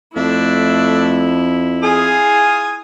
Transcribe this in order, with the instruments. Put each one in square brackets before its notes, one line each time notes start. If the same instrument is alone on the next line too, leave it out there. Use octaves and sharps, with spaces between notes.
[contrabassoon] F2 [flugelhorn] A3 [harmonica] D4 E5 [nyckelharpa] E4
[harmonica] F4 G#5 D#6 [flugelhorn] G#4